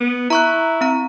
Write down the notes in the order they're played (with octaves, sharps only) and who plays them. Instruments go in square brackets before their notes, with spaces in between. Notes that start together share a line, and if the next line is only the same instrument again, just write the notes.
[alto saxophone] B3
[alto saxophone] E4 [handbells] A#5 C#6 F#6
[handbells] C4 A#5